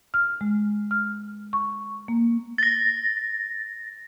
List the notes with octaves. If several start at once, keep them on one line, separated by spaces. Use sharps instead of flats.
F6
G#3
F6
C#6
A#3
A6 A#6